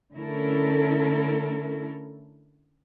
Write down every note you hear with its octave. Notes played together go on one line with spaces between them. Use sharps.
D3 A3 C#4 E4 A4 A#4